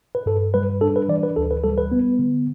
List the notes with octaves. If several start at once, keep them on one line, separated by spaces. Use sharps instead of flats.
B4
G2 A4
G3 B4
D4 A4
B4
E3 D5
B4
D2 A4
B4
G3 A4
B4
B3
D3